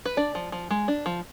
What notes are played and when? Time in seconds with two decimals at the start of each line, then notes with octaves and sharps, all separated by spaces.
0.05 B4
0.17 D4 D5
0.35 F3
0.52 F3
0.71 G#3
0.88 D4
1.06 F3